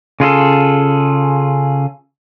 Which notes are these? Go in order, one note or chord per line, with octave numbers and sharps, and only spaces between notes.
C#3 F4 G#4 A4